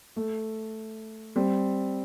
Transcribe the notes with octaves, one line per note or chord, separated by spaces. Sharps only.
A3
G3 C4